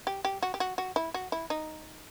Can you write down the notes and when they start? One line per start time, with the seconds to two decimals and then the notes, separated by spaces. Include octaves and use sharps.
0.07 G4
0.25 G4
0.43 F#4
0.54 G4
0.60 F#4
0.78 F#4
0.96 E4
1.14 F#4
1.32 E4
1.50 D#4